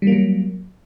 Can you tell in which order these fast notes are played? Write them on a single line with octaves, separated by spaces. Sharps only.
G3 A#3 F#3